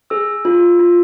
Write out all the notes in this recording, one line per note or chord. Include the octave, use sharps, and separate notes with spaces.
G#4 E6
F4
F4